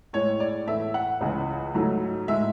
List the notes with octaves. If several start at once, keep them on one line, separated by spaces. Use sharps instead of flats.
A2 G#3 C#5
D5
A2 E3 A3 E5
F#5
C#2 C#3 E3 G#3
G#2 F#3 A3
A2 G#3 E5